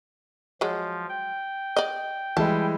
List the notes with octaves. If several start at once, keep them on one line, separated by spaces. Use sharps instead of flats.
F3 F#3 G#3
G5
D5 D#5
E3 G3 G#3 A5